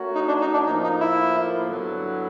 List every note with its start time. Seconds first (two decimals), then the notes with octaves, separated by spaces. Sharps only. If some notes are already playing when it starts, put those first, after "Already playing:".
Already playing: A3 C#4 F#4 A#4
0.15 D#4
0.28 D4
0.41 D#4
0.53 D4
0.66 A2 F3 A#3 D#4
0.83 D#4
1.00 E4
1.68 G2 D3 F#3 B3 E4